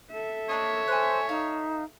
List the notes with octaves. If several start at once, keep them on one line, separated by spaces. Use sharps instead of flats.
A4 E5
A#3 D4 C#5 D#5
C5 G#5 F#6
D#4 F5